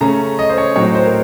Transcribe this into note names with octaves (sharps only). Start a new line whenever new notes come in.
C#3 A3 C#4 A#5
D#5
C5
C#5
A2 F#3 C4 D#4 C#5
C5
A#4